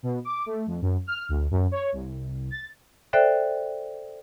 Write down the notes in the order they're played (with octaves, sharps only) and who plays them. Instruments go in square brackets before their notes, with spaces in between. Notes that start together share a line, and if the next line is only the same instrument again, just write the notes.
[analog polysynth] B2
D6
A3
F2
F#2
F6
D2
F#2
C#5
C2
A6
[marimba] A4 C5 D5 E5 G5 F#6